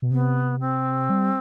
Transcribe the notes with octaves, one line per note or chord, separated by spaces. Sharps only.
B2
C3 B3
C4
G3